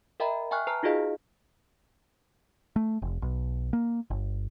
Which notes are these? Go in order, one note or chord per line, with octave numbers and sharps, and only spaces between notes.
A#4 D#5 E5 G5 A#5 B5
E5 G5 G#5 C#6 F6 F#6
B4 A5 A#5 F6
D#4 F4 F#4 G#4 D#5 F5
A3
F1
B1
A#3
G1